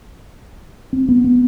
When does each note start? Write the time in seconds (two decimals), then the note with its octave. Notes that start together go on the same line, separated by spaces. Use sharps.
0.93 C4
1.09 B3
1.24 B3